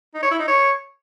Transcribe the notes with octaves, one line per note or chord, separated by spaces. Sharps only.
D#4
C#5
E4
D#4
C#5